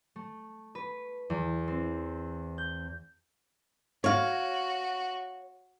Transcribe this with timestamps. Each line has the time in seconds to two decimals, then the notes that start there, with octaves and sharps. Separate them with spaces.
0.16 A3
0.75 B4
1.30 E2
1.68 C4
2.58 G6
4.04 F#4 C#5 F5